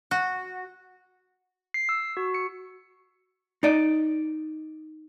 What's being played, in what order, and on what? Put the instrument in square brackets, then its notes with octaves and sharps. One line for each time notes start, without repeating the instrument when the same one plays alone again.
[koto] F#4
[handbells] C7
E6
F#4
C#7
[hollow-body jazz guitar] D#4 D5 D#5